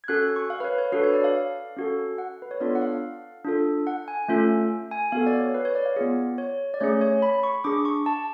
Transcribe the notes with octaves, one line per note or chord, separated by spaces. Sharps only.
G#6
C#4 F#4 A4 F#6
F#6
C#6
F5
B4
C#5
C#5
D4 F#4 A4 B4
C#5
D5
F5
C#4 F#4 A4
F#5
B4
C#5
B3 D4 F4 A4 D5
F#5
F5
D4 F4 A4
F#5
G#5
A3 C#4 F4 A4
G#5
B3 F#4 A4 F5
D5
C#5
B4
C#5
D5
F5
B3 F4 G#4 D5
C#5
D5
A3 C#4 G#4 C#5
C#5
B5
C#6
D4 G#4 D6
C#6
A5